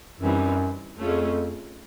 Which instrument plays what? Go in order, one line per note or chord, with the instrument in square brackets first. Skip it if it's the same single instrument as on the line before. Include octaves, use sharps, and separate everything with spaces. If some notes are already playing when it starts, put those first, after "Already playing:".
[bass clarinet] F#2 [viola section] E3 G3 C4 D#4
[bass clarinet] F2 [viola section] A3 C#4 F4 G#4